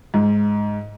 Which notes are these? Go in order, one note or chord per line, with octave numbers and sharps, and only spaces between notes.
G#2